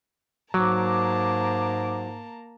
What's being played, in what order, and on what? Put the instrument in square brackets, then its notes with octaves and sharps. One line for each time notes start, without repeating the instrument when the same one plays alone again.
[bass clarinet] G#2 [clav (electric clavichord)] F#3 [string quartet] A#3 A5 A#5 [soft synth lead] D6